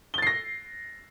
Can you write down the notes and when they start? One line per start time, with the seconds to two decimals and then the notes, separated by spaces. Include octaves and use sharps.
0.14 G7
0.18 A6
0.22 C7
0.27 A#6